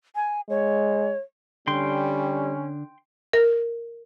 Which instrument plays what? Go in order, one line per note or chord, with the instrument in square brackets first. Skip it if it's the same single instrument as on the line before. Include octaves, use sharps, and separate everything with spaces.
[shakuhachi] G#5
[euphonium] G#3 [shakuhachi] C#5
[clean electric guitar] D3 [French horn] G3 [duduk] C#4 [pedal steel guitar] G5 C6
[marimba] A#4